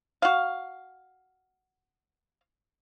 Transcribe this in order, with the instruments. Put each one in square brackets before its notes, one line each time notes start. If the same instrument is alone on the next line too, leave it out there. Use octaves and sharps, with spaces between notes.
[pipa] F#4 F5